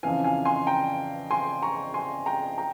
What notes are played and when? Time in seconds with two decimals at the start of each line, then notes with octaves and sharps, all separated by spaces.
0.03 F2 C#3 E3 F5 G#5
0.24 F5 G#5
0.45 G#5 C6
0.67 G5 A#5
1.31 G#5 C6
1.62 A#5 C#6
1.94 G#5 C6
2.26 G5 A#5
2.58 G5 A#5